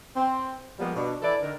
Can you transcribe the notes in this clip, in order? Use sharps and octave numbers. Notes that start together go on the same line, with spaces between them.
C4
F3 G3 G#3 A#3 B3
B2 D4
E3 E4 A4 D5
D3 D#3 A#4